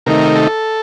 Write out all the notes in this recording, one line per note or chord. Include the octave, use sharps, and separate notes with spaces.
C3 D#3 A3 D#4 A#4
A4